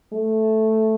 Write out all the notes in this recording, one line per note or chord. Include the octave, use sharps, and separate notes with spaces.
A3